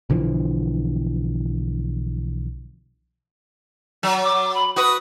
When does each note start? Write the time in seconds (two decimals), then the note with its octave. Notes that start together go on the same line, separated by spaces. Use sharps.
0.10 B1 D3 E3 F3
4.03 F#3
4.24 D6
4.54 B5
4.76 F#4 B4 D#6